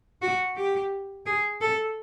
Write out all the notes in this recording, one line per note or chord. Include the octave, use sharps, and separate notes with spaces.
F#4
G4
G#4
A4